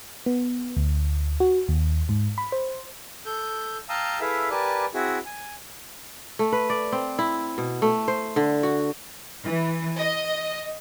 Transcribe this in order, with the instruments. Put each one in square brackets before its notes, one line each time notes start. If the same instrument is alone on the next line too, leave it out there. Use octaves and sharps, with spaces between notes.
[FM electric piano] B3
D2
F#4
D#2
G#2
B5
C5
[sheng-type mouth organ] A4 G6
F5 G5 A5 A#5 D#6 E6
E4 G#4 A4 B4 E5 F5
G4 A#4 B4 D5 G#5 A5
C4 E4 F#4 G#4
G#5
[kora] A3
B4
D5
C4
E4
B2
A3
C5
D3
F#4
[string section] E3
D#5